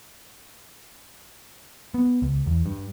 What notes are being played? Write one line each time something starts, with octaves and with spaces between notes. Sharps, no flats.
B3
C#2
E2
G2